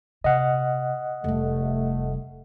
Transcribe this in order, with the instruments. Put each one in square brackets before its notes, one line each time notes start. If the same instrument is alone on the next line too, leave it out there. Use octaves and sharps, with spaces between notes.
[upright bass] C3 [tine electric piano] D#5 F#5
[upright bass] F1 G3 [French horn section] A3